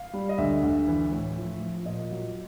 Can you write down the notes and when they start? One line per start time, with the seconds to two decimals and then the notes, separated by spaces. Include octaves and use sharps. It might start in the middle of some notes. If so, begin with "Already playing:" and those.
Already playing: F5
0.13 G3
0.29 D#5
0.38 D2 E5
0.63 D2
0.88 E3
1.12 A2
1.36 F3
1.61 F3
1.85 A#2 D#5
2.11 F#3